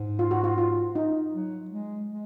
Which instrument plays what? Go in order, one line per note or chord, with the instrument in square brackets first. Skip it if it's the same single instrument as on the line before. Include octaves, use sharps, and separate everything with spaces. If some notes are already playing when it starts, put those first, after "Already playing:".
Already playing: [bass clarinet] G#2
[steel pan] F4
F#4
F4
F4
D#4
[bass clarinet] F#3
G#3
G#3